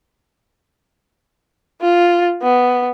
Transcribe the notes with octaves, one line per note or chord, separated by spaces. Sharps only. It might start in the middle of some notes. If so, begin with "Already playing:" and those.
F4
B3